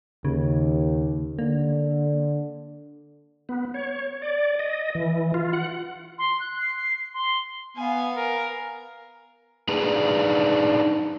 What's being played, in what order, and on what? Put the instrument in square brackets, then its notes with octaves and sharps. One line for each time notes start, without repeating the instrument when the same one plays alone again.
[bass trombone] D#2 [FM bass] C#3
[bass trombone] D3 [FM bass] A#3
[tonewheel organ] B3
C#5
D5
D#5
E3
F4
F#5
[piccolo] C6
F#6
C7
C6
[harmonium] B3 [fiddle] F5 G#5
[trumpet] A#4
[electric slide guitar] D4 D#4 G#4 B4